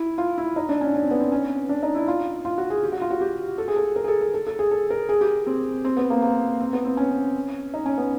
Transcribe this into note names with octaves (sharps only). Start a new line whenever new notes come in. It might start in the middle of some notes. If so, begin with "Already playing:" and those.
Already playing: E4
F4
E4
D#4
D4
C#4
C#4
C4
B3
C4
C#4
D4
D#4
E4
F4
F4
F#4
G#4
G4
F#4
F4
F#4
G4
A4
G#4
A4
A#4
G#4
A4
A4
A4
A4
G#4
A4
A#4
G#4
G4
C4
C4
B3
A#3
A#3
C4
B3
C4
C#4
D#4
C#4
B3